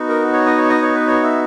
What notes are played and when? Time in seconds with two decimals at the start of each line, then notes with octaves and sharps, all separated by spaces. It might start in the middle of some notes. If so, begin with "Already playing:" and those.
Already playing: B3 D#4 F#4
0.09 A#4
0.33 C#5
0.46 D#5
0.58 C#5
0.69 D#5
0.82 C#5
0.95 B4
1.07 C#5
1.23 E5